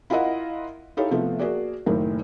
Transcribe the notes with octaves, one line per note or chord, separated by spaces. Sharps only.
E4 F4 A#4 D#5 E5 F#5
D#4 E4 G4 A4 C#5 F5
C3 F3 A3 B3 F4
A#3 F#4 G#4 D5
F#1 A2 D#3 A#3